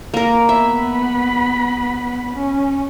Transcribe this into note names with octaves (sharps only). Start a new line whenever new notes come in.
A#3 A#4
B3 E5 B5
C#4